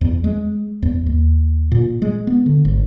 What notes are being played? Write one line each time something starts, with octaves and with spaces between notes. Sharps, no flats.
E2
G#3
E2
D#2
A#2
G#3
B3
D3
G#1